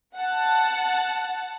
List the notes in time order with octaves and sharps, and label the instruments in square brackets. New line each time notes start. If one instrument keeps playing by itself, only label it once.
[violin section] F#5 A5